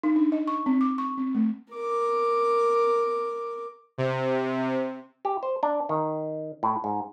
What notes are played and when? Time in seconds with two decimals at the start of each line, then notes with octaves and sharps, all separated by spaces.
0.03 D#4
0.16 D4
0.32 D#5
0.47 C#6
0.66 C4
0.81 D6
0.98 C#6
1.17 C4
1.35 A3
1.74 A#4 D6
3.98 C3
5.25 G4
5.43 C5
5.63 D4
5.89 D#3
6.63 A2
6.84 G#2